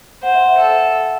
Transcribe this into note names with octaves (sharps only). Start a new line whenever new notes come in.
C5 F#5
E5
F#5
A4 E5